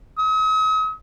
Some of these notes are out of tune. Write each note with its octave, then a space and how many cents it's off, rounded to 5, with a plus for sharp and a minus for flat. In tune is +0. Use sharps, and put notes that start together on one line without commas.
D#6 +45